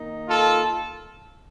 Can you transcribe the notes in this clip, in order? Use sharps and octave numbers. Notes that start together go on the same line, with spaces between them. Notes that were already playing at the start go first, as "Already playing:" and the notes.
Already playing: D#3 A#3 D#4
F4 A4